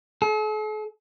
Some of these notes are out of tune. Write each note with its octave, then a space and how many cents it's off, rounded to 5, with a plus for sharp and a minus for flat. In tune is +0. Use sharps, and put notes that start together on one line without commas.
A4 -45